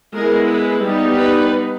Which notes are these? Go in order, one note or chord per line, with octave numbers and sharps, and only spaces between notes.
G#3 B3 E4 A#4
B4
G3 B3 D#4
B4